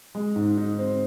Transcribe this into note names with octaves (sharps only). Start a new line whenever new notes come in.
G#3
G#2
D#4
C4